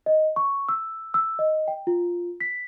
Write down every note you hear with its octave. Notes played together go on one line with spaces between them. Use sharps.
D#5
C#6
E6
E6
D#5
G5
F4
B6